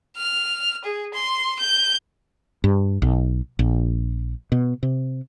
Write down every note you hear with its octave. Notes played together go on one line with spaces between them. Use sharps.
F6
G#4
C6
G6
G2
B1
A#1
B2
C3